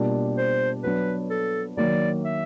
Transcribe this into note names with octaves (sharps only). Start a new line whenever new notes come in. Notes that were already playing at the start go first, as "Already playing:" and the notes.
Already playing: B2 G3 A#3 D4 F4
C5
F#3 B3 D4 B4
A4
D#3 F#3 A#3 D5
E5